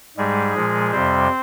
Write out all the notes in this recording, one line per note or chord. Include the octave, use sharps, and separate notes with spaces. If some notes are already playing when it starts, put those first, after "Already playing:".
G#2 G3 G#3 G#4
A#2 F3 G#3
F2 C3 G3 C4 C5